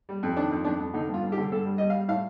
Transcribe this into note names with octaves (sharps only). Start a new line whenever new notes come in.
G3
F2
D#3 D4
F2
F2 D4
F2
D3 D#4
G2
F4
G2
G4
D3
G2 A4
G3
G3 D#5
F5
G3
A2 F5